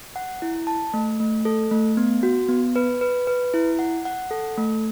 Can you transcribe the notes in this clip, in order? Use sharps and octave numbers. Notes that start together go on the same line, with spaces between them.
F#5
E4
A5
A3
A3
A4
A3
B3
F#4
B3
B4
B4
B4
E4
F#5
F#5
A4
A3